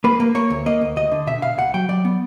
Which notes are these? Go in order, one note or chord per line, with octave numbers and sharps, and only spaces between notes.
A#3 B4
A#3
A#3 C#5
D2
A#3 D#5
D2
D2 D#5
D3
B2 E5
B2 F5
C#2 F#5
F#3 G5
F#3 D5
B3